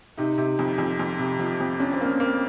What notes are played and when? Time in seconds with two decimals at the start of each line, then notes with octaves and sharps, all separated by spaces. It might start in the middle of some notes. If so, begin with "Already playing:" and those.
0.17 C3 D#4
0.38 C3
0.59 F2
0.78 F2
1.00 F2
1.19 C3
1.39 F3
1.60 F2
1.79 C#4 D4
1.93 C4
2.01 A#3 C#4
2.20 A#3